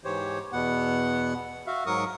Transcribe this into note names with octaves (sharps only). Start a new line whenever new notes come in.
G#2 E3 G4 C5 C#5
E2 B2 B3 F#5
F#4 E5 F5
G#2 F#3 A#4 C#6 D#6